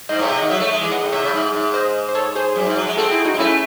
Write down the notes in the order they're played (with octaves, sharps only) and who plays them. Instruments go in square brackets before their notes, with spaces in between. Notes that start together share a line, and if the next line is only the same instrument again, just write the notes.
[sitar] G#2 [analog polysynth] C5 D#5
[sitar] A2 [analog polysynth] C#5 E5
[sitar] C3
[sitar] D#3 [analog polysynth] D#5 F#5
[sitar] F#3 [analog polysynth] C#5 E5
[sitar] A3
G#3
E3
[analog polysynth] D#5 F#5
[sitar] A2
[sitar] C3 [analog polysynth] C#5 E5
[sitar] C#3
G#2
G#2
[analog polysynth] C5 D#5
C5
A4 C#5
G#4 C5
[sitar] F#2
G#2
F#3
G#3
[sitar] C4 [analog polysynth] F#4 A4
[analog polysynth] E4 G#4
D#4 F#4
[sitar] C4
[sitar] A3 [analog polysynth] C#4 E4